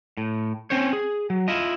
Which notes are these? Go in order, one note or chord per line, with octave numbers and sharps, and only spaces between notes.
A2
C4 C#4 C5 C#5
G#4
F#3
E4 F4 D#5